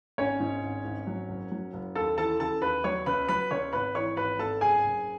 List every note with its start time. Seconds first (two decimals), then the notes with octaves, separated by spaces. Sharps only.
0.18 G#1 C#4 C#5
0.40 G#2
0.63 G#1
0.85 G#1
1.07 F#3
1.29 F#1
1.51 F#3
1.73 F#1
1.95 D#2 A4 A5
2.18 E3 A4 A5
2.40 C#3 A4 A5
2.62 D#2 B4 B5
2.84 F#3 C#5 C#6
3.06 C#2 B4 B5
3.29 F#3 B4 B5
3.51 C#2 C#5 C#6
3.73 G#1 B4 B5
3.95 E3 C#5 C#6
4.17 G#1 B4 B5
4.39 G#1 A4 A5
4.61 F#1 G#4 G#5
4.84 F#1